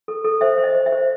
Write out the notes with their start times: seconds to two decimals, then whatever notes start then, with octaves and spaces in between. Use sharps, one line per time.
0.08 A4
0.25 A4
0.41 C5 E5
0.58 C5
0.63 D#5
0.75 C5
0.86 E5
0.92 C5